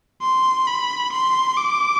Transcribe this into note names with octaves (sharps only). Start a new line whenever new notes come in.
C6
B5
C6
D6